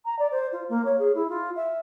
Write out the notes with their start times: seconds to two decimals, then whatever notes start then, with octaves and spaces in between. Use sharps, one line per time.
0.05 A#5
0.18 D5
0.31 C5
0.52 F4
0.69 A#3
0.84 C#5
0.99 G#4
1.14 E4
1.29 F4
1.56 E5